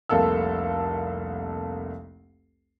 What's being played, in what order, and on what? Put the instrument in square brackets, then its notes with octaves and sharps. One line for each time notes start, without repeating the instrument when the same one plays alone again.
[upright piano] F1 C2 A#3 A4 F5 E6